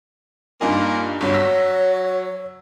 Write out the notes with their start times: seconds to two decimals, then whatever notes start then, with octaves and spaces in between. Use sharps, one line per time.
0.61 G2 A#2 A#3 D#4 G#5
1.21 G1 G2 F#3 C#5
1.34 E6 A#6 B6